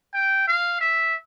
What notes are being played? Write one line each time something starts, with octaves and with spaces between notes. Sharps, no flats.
G5
F5
E5